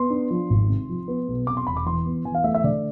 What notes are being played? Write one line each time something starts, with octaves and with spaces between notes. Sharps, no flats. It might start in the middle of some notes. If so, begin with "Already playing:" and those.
Already playing: B3 C6
D4
F3
G#1
C3
F3
B3
B1
C3 D6
C6
E1 B5
D6
E3 C6
B3
E3 G#5
F5
A3 E5
E5
D3 D5